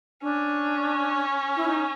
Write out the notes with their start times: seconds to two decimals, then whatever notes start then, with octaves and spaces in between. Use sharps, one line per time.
0.22 C#4 D4
1.57 E4
1.68 D#4